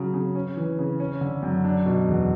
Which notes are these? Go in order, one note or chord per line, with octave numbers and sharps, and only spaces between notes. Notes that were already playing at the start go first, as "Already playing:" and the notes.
Already playing: C#3 F#3
C#3
C#4
E3
C#3
C#4
D3
F#2
D4
B2
E2